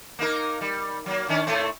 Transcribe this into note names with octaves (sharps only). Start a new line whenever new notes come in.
A#3 D#4 A#4
G3
F#3 A#3
D#3 C#4 D4
A2 A3 C4